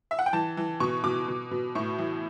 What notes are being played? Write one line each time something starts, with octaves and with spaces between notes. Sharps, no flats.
E5
F#5
G5
E3 A5
E3
B2 C#6
B2 D6
B2
B2
A2 C#6
E3